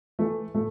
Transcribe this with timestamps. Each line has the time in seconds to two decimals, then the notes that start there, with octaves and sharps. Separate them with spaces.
0.19 E3 A3
0.54 A2 A3